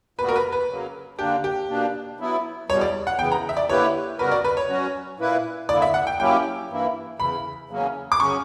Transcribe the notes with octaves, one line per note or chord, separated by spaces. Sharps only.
A#2 G3 B3 F#4 B4
A#4
B4
B4
C#3 F#3 A#3
D3 A#3 D4 G4
G4
B2 A#3 D4
F#3 B3 E4
E2 B2 G3 C#5
D5
F#5
C#3 E3 B3 G5
A#5
E5
D5
D3 A#3 E4 G4 B4 C#5
C#3 G3 B3 F#4 A#4 B4
D5
B4
C#5
F#3 C#4 F#4
A#2 A#3 E4 B4
D3 A#3 E4 D5
E5
F#5
G5
F#3 A#3 C#4 E4 G4 G5
G2 E3 A#3 E4
E2 C#3 E3 B5
E2 C#3 F#3 A#3 C#4
D6
C#3 F#3 C#4 C#6